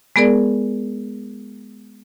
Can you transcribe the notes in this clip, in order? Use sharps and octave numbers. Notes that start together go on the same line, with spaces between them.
G#3 B3 G#4 A#4 D5